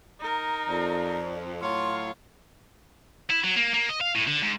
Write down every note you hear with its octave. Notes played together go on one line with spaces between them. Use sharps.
D#4 A#4
F2 D5
A2 F#3 F4 C#5 F5 C6
E4
F#3
A#3
A#3
D#5
F5
A2
D3
G#2